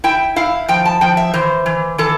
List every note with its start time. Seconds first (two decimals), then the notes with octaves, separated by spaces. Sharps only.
0.04 E4 G5
0.36 E4 F5
0.68 F3 G5
0.85 A5
1.01 F3 G5
1.17 E5
1.34 E3 C5
1.66 E3
1.98 E3 A4